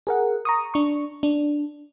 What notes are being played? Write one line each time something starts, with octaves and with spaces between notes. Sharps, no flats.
G#4 A#4 F#5
A#5 C#6 D#6
D4 C#6
D4